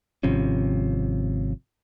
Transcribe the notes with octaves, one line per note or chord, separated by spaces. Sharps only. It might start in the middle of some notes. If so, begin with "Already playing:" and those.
G#1 C3 F3 C#4